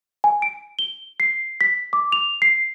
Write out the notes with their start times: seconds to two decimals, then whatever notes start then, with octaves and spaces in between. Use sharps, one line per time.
0.24 G#5
0.42 D7
0.79 G7
1.20 C7
1.61 B6
1.93 D6
2.12 F7
2.42 C7